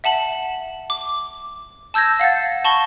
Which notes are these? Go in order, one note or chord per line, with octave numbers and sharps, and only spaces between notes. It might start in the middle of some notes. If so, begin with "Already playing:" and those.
E5 F#5 A5 F#7
D6
A5 E6 G6 G#6 A#6
F5 F#5 G6 A6
A5 B5 C#6 A#6 G7